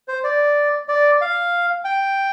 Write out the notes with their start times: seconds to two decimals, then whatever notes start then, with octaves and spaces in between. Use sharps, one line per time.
0.08 C5
0.24 D5
0.88 D5
1.21 F5
1.85 G5